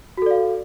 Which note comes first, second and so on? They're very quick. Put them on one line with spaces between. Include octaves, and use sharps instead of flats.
F#4 A4 D5 F5